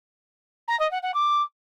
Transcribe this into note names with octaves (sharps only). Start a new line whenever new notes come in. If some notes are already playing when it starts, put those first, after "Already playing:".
A#5
D#5
F#5
F#5
D6